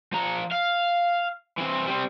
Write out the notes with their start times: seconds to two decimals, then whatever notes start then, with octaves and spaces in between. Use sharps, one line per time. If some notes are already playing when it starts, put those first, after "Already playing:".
0.12 F3 A#5
0.52 F5
1.58 E3 C4
1.87 G3 C4